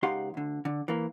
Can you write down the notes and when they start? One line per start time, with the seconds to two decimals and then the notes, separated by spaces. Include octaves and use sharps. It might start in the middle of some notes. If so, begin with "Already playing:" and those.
0.03 C#2 D#4 G4 F5 F#5 C6
0.34 D2 D3
0.65 D3
0.88 E3 A#3